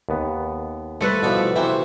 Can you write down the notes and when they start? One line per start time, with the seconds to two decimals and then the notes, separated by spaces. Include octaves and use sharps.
0.09 D#2 B3
1.01 G3 A3 A4 B4 C5
1.23 B2 E3 F3 D5 E5
1.56 C3 E3 F#4 G4 C5 E5